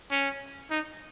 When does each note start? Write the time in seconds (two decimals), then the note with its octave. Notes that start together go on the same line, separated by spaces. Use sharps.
0.11 C#4
0.70 D#4